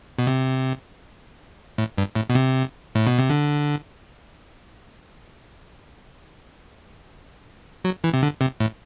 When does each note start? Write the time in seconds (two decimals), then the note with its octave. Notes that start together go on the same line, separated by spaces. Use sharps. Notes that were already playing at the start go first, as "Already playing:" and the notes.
0.19 B2
0.27 C3
1.78 A2
1.98 G2
2.15 A2
2.30 B2
2.35 C3
2.95 A2
3.07 B2
3.18 C3
3.30 D3
7.85 F#3
8.04 E3
8.14 C3
8.22 D3
8.41 C3
8.60 A2